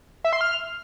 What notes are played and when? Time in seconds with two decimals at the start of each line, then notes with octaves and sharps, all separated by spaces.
0.24 E5
0.33 C6
0.41 F6